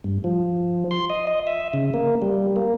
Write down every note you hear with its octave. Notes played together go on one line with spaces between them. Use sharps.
G2
F3
C6
D#5
D#5
E5
C#3
A#3
G3
A#3